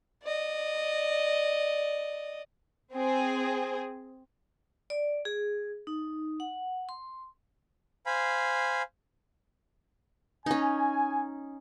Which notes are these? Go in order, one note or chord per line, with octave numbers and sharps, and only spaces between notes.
D5 D#5
C4 G#4
D5
G#4
D#4
F#5
C6
C5 F5 G#5 B5
C#4 D#4 G#5